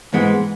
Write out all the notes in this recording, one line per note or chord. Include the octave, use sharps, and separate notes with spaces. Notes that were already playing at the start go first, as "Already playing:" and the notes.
G#2 E3 G#3 B3